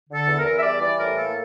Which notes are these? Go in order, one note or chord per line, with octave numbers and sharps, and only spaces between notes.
D3
A4
E2
A#4
E2
E5
G3 D5
E3 D5
A2 A#4
A#3 A4